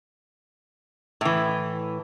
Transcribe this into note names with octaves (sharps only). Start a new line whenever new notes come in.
A2 E3